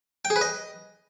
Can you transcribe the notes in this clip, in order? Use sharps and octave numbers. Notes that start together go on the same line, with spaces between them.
G5
G#4
B4
D#5